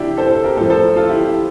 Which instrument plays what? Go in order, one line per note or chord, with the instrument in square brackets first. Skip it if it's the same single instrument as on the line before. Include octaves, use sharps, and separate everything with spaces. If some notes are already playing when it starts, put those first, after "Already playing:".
Already playing: [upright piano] C3 E3 D4 E4 G4
A4 C5
A4 C5
G4 A#4
A2 F3 A4 C5
A4 C5
F4 A4
E4 G4